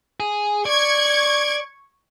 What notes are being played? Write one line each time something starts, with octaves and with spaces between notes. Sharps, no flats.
G#4
D5 C#6 G#6